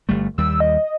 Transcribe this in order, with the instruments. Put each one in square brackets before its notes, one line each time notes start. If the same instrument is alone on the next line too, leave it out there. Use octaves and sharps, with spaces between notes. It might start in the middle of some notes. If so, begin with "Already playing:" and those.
[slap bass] G1 G3 A3
[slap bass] D#2 G3 [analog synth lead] E6
[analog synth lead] D#5